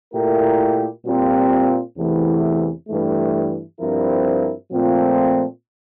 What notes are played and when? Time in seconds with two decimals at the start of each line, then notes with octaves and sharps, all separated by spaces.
0.14 A#2 A3 E4 G4 A#4
1.05 A#2 G3 C4 F4
1.96 E2 C3 E3 A3
2.89 G2 E3 A3
3.80 G2 F3 C4 E4 A#4
4.71 A#2 F3 A3 C4 F4